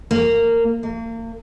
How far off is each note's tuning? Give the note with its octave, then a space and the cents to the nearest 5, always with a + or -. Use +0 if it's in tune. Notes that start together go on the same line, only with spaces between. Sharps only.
A#3 -15
A#3 -35